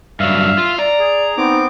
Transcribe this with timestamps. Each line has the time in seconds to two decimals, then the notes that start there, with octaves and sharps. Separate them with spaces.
0.20 G2 F#3 E5 F5 F6
0.58 F4
0.79 D5 A#5
0.99 G#4
1.37 B3 C4 D#4 D6